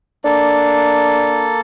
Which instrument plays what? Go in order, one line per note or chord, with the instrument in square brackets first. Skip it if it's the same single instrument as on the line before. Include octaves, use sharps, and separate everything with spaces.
[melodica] A#3 A4 [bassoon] D4